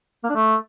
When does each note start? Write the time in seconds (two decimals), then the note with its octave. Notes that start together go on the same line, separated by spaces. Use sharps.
0.24 A#3
0.29 D4
0.35 A3